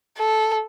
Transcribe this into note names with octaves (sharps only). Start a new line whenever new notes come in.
A4